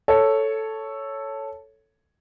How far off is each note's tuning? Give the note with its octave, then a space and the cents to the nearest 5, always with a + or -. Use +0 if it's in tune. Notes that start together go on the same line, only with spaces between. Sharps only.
A4 +0 C#5 +0